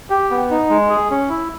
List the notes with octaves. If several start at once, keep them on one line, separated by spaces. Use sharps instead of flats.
G4
B3
D#4
G#3
G#4
C#4
E4